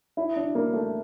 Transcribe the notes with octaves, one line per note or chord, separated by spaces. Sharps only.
E4
D4
A#3
A3